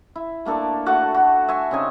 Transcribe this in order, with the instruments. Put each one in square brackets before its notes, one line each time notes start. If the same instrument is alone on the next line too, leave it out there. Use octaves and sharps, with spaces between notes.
[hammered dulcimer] E4
A3 A#3 D4 A4
A3 F#4 F#5 D6
F#4
E5 G#5 C#6
C#3 C4 D#4 G#5